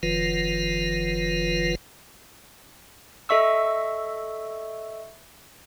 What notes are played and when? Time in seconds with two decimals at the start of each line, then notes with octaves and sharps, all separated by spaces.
0.03 F#1 D#3 F3 F4 B4
3.29 A4 D#5 E5 C#6 E6